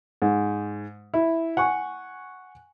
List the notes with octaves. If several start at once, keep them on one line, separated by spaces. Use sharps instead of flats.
G#2
E4
F#5 G#5 C#6